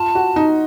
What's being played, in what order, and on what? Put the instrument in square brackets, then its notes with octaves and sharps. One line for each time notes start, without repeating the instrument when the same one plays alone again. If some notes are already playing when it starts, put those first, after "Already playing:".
Already playing: [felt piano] F4 [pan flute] A5
[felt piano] F#4
D#4